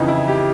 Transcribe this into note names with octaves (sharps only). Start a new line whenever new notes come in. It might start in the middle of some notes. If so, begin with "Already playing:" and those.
Already playing: F2 C#3 E3 D#4
E4
G4